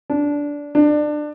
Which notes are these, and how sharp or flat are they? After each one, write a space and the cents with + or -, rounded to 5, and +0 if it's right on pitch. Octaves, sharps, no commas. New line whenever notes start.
D4 -15
D4 +25